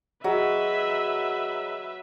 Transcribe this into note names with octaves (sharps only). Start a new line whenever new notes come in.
F#3 F#4 G#4 B4 D#5 E5